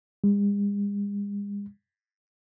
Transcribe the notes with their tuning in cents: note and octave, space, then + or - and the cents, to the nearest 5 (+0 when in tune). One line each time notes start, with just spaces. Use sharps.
G#3 -45